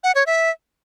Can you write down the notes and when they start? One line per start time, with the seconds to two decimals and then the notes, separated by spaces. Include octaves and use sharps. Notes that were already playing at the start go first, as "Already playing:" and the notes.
0.04 F#5
0.15 C#5
0.26 E5